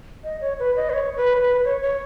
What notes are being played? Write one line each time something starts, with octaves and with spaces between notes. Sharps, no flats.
D#5
C#5
B4
D#5
B4
C#5
B4
B4
C#5
C#5